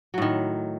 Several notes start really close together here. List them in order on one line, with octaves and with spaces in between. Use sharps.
F#3 A2 D#3